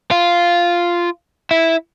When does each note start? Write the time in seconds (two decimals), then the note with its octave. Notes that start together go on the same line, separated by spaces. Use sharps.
0.11 F4
1.51 E4